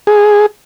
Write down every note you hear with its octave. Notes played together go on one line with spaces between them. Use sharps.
G#4